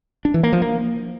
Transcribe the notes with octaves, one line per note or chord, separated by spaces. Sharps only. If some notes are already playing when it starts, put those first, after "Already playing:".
D4
E3
A#3
F3
A#3